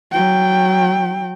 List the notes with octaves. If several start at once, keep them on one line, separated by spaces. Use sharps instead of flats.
F#3 G5